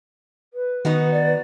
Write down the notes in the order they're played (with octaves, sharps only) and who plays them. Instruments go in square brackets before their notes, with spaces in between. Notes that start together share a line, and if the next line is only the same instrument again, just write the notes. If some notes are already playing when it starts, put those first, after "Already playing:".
[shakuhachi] B4
[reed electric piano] D#3 [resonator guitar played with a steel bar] B3 D#4 F#4
[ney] D5